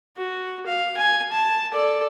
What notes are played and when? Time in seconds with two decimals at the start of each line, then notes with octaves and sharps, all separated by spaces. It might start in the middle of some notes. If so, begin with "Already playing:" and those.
0.17 F#4
0.66 F5
0.97 G#5
1.32 A5
1.73 A4 D5